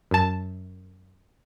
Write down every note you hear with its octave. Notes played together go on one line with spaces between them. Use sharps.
F#2 A5